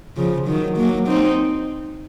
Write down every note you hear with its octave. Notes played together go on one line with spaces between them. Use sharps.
C#3 F3
D#3 F#3
F#3 A#3
C4 D#4